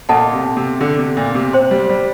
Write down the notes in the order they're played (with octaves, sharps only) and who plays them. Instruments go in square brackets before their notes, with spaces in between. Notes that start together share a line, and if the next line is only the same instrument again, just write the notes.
[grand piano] A#2 [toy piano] A4 D#5 F#5 A5
[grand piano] C3
C3
D3
C3
A#2
C3
[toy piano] C5 G5 C6
[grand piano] G3
G3